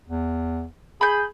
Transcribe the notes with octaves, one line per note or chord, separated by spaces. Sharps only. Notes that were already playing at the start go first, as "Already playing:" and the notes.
E2
G#4 B5 G6